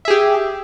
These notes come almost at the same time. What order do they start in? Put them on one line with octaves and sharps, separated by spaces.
E5 G#4 G4